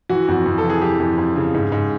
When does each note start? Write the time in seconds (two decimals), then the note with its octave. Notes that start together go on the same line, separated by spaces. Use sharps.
0.09 E3 F#4
0.28 F2 F#4
0.46 F2
0.58 A4
0.64 E3
0.70 G#4
0.82 E3 G4
1.00 F2
1.18 F2
1.36 C#3
1.54 G#2
1.72 G#2